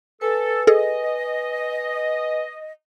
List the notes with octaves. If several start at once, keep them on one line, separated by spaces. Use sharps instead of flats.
A4 B4 G#5
G#4 A4 D#5